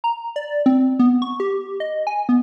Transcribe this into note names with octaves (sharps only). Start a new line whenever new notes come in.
A#5
D5
C4
B3
C#6
G4
D#5
G#5
B3